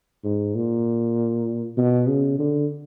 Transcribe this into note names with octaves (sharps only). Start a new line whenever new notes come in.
G#2
A#2
B2
C#3
D3